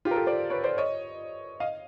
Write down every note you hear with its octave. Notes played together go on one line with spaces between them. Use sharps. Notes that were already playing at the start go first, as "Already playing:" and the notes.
F4 G4
A#4
G4 A4
C5 D5
B4 C#5
C5 D5
C#5 D#5
D#5 F5